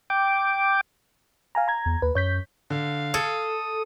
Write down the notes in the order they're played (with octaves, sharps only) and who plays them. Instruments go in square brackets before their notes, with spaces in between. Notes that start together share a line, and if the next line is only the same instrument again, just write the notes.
[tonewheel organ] G5 D6
[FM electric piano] F5 G#5 A#5
A#5 G#6
[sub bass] E2
[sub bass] D#2 [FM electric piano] B4
[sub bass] F#2 [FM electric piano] C#5 G6 B6
[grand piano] D3 [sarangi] F5
[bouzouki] A4 [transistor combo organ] D#6 [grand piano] G#6 A6 C#7